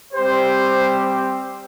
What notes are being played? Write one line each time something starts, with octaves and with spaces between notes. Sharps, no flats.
G3 C4 G4 C5